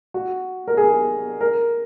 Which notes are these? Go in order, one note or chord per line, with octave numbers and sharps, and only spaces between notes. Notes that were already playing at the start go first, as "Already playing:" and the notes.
F#4
A#4
G#4
A#4